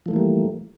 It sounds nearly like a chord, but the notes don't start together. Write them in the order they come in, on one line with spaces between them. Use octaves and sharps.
F3 A3 E3 A#3 G3